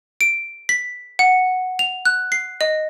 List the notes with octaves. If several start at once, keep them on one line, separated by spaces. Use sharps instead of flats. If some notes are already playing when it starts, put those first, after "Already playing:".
D7
B6
F#5
F7
F#6
C7
D#5